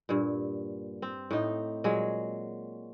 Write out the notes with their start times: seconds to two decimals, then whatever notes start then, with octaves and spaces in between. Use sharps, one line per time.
0.09 G2 A#2
1.02 C4
1.31 A2 D#4
1.84 A#2 F#3 G#3